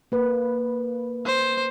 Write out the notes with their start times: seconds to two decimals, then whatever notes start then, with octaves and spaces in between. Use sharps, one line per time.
0.12 A#3 B4
1.26 C5